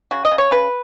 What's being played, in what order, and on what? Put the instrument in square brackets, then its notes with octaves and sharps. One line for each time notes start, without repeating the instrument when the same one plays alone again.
[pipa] C#3 F#4
D#5
C#3
C#5
C#3 B4